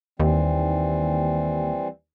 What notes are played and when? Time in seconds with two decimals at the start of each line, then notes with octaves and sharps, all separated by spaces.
0.20 D#2 E3 G3 C4